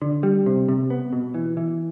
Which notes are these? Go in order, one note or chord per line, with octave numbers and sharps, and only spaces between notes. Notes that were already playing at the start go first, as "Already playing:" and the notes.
D3
G3
C3
C3
B3
B2
E3
E3